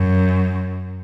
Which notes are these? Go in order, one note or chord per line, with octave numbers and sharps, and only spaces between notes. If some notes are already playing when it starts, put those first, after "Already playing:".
Already playing: F#2